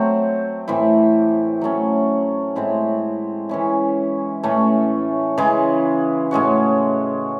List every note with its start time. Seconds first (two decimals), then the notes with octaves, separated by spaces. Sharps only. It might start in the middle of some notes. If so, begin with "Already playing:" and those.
Already playing: F#3 A3 C4
0.68 A2 E3 C4 E4
1.61 F#3 A3 C#4
2.56 A2 G#3 C4 E4
3.49 E3 G#3 C#4 E4
4.43 A2 E3 A3 C#4
5.38 C#3 E3 G#3
6.31 A2 G#3 C#4 F#4